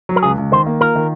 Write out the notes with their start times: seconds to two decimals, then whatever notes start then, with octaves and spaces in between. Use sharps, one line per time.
0.09 F#3
0.16 A#4
0.23 C#2 G#4
0.37 C#2
0.52 D#3 C5
0.66 A#3
0.81 F4 A#4
0.95 D#3